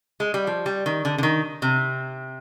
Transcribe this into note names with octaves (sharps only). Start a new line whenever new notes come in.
G#3
G3
F3
G3
D#3
D3
D3
D#3
C3